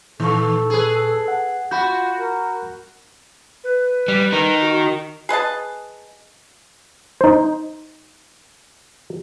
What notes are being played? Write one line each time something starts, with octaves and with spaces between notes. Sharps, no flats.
A#2 D#3 A4 C#6
G#4 B4
F#5
F4 F#4 F#5 B5 G6
A#4
B4
G3
D#4 A#4
F#4
G#4 B4 D#5 A5
D#4 C5